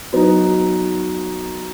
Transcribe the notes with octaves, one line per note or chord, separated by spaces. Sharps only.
F#3 B3 D#4